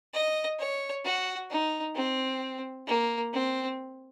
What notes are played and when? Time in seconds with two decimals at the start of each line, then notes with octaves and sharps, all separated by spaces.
0.13 D#5
0.59 C#5
1.04 F#4
1.50 D#4
1.95 C4
2.87 A#3
3.33 C4